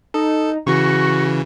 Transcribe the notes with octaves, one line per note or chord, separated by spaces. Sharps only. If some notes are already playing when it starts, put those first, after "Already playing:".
D#4 A4
C#3 E3 F#4 C#6